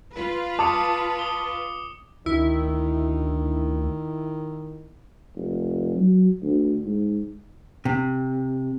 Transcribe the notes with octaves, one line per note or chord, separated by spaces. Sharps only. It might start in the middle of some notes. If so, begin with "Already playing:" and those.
F4 B4
A5 D6 D#6 C#7
D#6 G7
D2 D#3 E4
F1
F#3
D2
G#2
C3